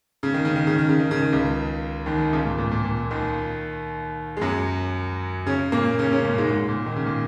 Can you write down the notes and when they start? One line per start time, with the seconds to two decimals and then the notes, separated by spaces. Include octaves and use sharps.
0.23 C#3
0.34 D#3
0.45 C#3
0.56 D#3
0.67 C#3
0.78 D#3
0.89 C#3
0.99 D#3
1.11 C#3
1.22 D#3
1.32 C#2 C#3
2.06 D#2 D#3
2.33 C#2 C#3
2.46 A#2
2.58 A#2
2.71 A#2
2.85 A#2
3.11 D#2 D#3
4.37 G#3
4.41 F#2 F#3
5.46 C#3 C#4
5.72 A#2 A#3
5.99 C#3 C#4
6.12 C#3 C#4
6.25 A#2 A#3
6.38 G#2 G#3
6.51 G#2
6.69 A#2
6.86 D#3
6.96 C#3
7.07 A#2